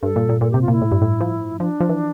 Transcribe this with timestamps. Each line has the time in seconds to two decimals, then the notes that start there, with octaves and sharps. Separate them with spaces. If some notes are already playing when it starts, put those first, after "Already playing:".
0.02 G2 A4
0.16 A#2
0.29 A#2
0.41 A#2 A4
0.51 C3 G4
0.62 F4
0.68 A#2 E4
0.82 A2
0.92 G2
1.02 A2
1.21 F3
1.60 F3 D4
1.80 F3
1.89 E3